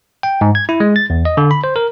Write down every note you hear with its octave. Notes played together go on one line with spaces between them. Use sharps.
G5
G#2
G#6
E4
G#3
A6
E2
D#5
D3
B5
C5
A#4